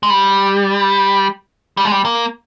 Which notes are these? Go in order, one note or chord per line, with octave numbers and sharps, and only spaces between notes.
G#3
G3
G3
G#3
G3
A#3